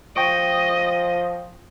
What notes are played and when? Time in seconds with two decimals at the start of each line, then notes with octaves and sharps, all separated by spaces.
0.16 F3 D#5 G5 C#6 D7